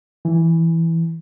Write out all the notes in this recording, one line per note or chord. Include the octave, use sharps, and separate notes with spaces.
E3